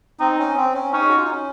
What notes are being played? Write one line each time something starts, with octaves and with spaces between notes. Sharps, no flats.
C4 D#4
C#4
C4
C#4
C#4 D#4
G#4
F#4
F4
D#4
C#4